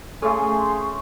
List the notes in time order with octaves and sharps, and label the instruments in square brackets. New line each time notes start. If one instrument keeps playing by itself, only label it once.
[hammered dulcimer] A3 C#4 [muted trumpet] G#4 [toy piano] A4 [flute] C6